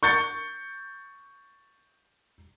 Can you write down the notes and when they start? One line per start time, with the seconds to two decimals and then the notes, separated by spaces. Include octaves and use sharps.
0.03 C#6 G6 A6 C#7